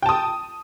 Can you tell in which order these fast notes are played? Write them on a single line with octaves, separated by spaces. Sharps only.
G5 A5 D#6